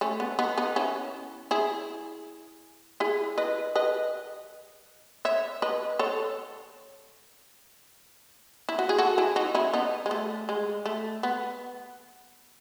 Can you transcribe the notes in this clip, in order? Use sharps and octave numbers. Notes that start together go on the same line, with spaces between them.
A3 C#4
B3
B3 D#4
B3 D#4
C#4 E4
E4 G#4
E4 G#4
B4 D#5
B4 D#5
C#5 E5
B4 D#5
A4 C#5
E4
F#4
G#4
F#4 A4
E4 G#4
D#4 F#4
C#4 E4
B3 D#4
G#3
A3
G#3
A3
B3